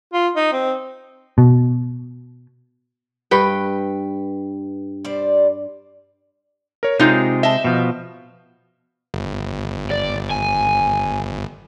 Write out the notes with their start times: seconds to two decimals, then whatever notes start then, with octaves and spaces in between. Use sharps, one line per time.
0.14 F4
0.36 D#4
0.53 C4
1.38 B2
3.31 G2 B4 G5
5.05 G3 C5 D5
6.83 A#4 C#5
7.00 C3 G#3 D#4 F4 G6
7.43 D#5 E5 A5
7.64 B2 F3
9.14 G1
9.91 D5
10.30 G#5